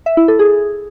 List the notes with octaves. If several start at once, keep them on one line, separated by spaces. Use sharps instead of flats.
E5
E4
A4
G#4